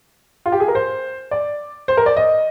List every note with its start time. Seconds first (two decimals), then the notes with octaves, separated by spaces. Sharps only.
0.46 F4
0.52 G4
0.60 G#4
0.68 A#4
0.75 C5
1.31 D5
1.88 C5
1.97 A#4
2.06 D5
2.17 D#5